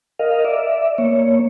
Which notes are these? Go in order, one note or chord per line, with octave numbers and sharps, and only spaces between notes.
A#4 D#5 F5
D5 E5
A#3 C#5